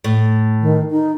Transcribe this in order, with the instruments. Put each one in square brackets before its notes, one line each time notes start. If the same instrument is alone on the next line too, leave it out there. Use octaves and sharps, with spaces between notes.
[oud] A2
[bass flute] D#3
D#4